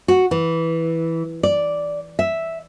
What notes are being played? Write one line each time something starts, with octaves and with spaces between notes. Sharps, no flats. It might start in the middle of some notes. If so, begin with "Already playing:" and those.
F#4
E3
D5
E5